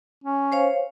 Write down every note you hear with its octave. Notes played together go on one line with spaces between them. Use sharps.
C#4
C5 C#5 F5